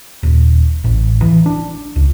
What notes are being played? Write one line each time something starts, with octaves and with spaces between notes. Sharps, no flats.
D#1
A1
E3
D4
C#2